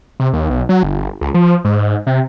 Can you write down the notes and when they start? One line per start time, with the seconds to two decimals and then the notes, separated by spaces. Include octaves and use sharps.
0.20 C3
0.33 D#2
0.50 B1
0.69 F#3
0.83 G1
1.21 C#2
1.35 F3
1.65 G#2
2.07 C3